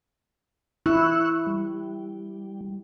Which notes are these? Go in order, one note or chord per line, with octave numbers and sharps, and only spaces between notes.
E4 C#6 E6 F#6
G3